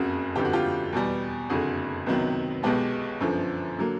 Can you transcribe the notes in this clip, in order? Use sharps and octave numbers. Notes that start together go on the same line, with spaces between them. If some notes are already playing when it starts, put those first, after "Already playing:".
Already playing: F#1 F2 C#3 F#4 G#4
G1 F2 D3 G4
F#4
F4 G4
E2 B2 G3
F#1 F2 D3 F#4 G#4
C#2 C3 D#3 F#3 B3
B1 B2 G#3 B3 G4 A4
G1 F#2 D3 F3
D3 F#3 A#3